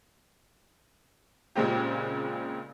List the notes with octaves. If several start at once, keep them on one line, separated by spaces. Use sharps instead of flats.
A#2 C#3 G#3 C4 G4